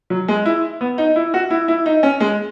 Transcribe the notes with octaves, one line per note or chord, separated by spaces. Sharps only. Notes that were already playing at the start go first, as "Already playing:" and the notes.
F#3
G#3
E4
B3
D#4
E4
F#4
E4
E4
D#4
C#4
G#3